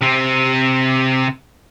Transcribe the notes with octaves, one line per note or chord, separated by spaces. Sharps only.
C3 C4